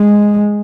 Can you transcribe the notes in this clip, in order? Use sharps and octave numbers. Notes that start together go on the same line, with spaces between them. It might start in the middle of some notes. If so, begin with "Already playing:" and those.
Already playing: G#3